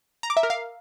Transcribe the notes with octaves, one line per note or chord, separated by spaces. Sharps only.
A#5
D6
E5
A#4
F5